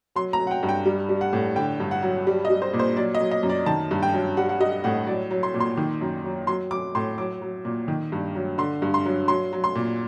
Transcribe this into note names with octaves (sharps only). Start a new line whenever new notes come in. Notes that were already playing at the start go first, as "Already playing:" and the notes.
F#3 C6
A#5
F#3
F#5
G5
G2
G5
G3
G3
F#5
A2
D3 G5
G2
F#5
F#3
G3
D#5
G3
C5
A#2
C5
F#3 D5
D#5
F#3
D#5
F#2
D5
D#3 A5
G2
G5
F#3
G3 F#5
F#5
G3 D#5
A2 F#5
F#3 D5
F#3
C6
A#2
C6
D#3
F#2
F#3
F#3 C6
F#3 D6
A2 C6
F#3 D6
F#3
A#2
D#3
G2
F#3
D3 C6
G2
C6
F#3
F#3 C6
F#3
C6
A#2